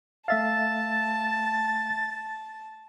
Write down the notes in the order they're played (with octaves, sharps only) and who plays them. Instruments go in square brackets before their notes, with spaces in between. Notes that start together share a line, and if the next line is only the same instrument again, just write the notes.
[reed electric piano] A3 E5 F5 [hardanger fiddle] A5 [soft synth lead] A6